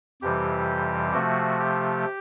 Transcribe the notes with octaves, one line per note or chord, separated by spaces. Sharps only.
F2 C3 E3 G3 G4
C3 F3 A3 F#4
G4